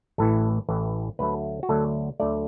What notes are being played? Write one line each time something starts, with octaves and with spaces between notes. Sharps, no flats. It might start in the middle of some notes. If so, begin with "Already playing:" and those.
A1 A2 E3 A4
A1 A2 E3
D2 D3 F#3 A3 B4
F#4
D2 D3 F#3 A3 A4
D2 D3 F#3 A3 D5